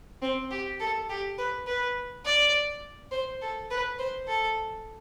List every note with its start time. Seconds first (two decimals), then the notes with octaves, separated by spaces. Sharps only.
0.22 C4
0.51 G4
0.80 A4
1.10 G4
1.38 B4
1.67 B4
2.25 D5
3.11 C5
3.42 A4
3.71 B4
3.99 C5
4.28 A4